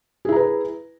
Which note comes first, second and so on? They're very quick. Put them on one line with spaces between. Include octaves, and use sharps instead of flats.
G#4 E4 A#5 B4